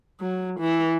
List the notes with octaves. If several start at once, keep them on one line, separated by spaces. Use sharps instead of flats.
F#3
E3